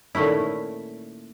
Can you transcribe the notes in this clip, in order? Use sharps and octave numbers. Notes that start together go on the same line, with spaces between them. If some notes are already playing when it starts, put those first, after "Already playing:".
A#2 D#3 A3 C#4 E4